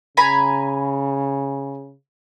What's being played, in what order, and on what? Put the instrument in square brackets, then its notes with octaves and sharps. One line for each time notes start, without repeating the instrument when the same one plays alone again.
[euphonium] C#3 [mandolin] G#5 A#5 B5